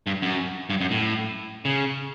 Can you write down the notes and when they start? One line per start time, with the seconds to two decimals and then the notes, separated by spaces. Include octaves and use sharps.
0.07 G2
0.22 F#2
0.70 G2
0.81 F#2
0.91 A2
1.65 C#3